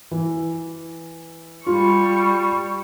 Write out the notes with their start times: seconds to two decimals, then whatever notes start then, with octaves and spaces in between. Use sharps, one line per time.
0.11 E3
1.67 G3 F4 C#6